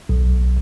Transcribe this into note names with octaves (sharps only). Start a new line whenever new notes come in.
B1